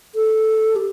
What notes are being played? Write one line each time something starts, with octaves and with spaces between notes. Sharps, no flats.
A4
G4